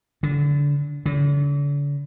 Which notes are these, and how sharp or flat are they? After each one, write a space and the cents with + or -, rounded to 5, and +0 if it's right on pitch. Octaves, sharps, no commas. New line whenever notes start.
D3 -25
D3 -45